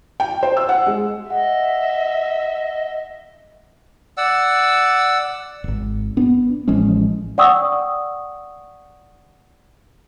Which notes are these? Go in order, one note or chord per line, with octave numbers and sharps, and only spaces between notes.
G5
C5
E6
F#5
G#3
D#5 E5 F#5
D5 F#5 E6
D#1 G#1
B3 D4
A1 F3 G#3 C#4
D5 F#5 G5 C#6 D#6 E6